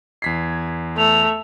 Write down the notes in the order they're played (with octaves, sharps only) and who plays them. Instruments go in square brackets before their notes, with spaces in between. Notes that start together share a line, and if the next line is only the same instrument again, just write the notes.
[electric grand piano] E2 B6 C7 [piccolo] G#6
[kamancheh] A3 [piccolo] F7